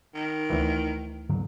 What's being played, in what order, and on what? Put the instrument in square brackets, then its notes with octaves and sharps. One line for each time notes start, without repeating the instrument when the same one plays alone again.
[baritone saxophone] D#3
[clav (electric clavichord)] D2 E3
[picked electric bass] G2 D3 F#3